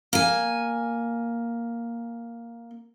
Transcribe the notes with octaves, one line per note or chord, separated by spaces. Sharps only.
A#3 G#5